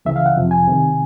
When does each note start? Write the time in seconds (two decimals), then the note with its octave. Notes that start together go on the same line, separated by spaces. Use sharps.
0.05 C#2 C#3 E3 E5
0.16 F5
0.26 F#5
0.36 F2 C3 F3
0.51 G#5
0.66 C2 C3 D#3